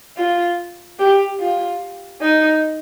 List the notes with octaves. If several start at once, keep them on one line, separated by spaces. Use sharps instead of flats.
F4
G4
F4
D#4